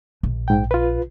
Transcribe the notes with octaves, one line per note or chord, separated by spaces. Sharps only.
A#1
G#2 G5
F4 B4